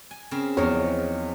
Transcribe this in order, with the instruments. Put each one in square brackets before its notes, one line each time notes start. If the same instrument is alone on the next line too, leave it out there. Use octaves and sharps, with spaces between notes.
[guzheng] G#5
C#3 C4 A#4
[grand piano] E2 [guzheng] F3 D#4 A#4 [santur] C#5